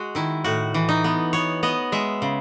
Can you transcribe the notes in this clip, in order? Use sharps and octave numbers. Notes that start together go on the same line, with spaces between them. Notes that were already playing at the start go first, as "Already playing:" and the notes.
Already playing: G#3 F#4
D#3 E4
A2 F#4
E3
D#4
B3
B3 C#5
B3 D#5
G#3 E5
C#3